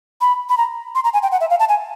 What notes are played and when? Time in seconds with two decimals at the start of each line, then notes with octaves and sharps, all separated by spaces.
0.21 B5
0.49 B5
0.57 A#5
0.95 C6
1.04 A#5
1.13 G#5
1.23 G5
1.32 F#5
1.41 E5
1.50 F5
1.60 A5
1.69 G#5